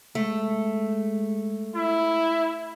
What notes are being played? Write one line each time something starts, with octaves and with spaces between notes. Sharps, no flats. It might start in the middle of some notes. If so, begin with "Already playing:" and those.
G#3 A3
E4